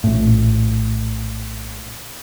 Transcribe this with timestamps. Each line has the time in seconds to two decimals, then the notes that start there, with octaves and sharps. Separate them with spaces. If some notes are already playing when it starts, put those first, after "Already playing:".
0.04 A#1 A2